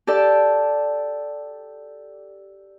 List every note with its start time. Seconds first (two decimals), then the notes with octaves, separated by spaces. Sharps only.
0.07 G4 A4 D5 A5